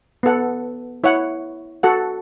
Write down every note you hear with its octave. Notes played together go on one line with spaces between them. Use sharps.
B3 A4 F#5
E4 C#5 F#5
F#4 A4 F#5